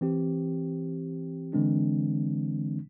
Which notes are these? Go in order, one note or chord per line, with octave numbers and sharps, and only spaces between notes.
E3 C4 G4
D3 E3 G#3 C4 D4